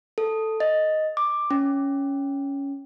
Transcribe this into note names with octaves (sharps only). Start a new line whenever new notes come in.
A4
D#5
D6
C#4